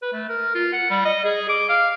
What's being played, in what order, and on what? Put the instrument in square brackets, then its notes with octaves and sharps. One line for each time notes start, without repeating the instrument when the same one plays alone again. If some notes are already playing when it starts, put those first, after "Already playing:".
[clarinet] B4
A3
A#4
F4
F#5
G3
D#5
G#4
D6
F5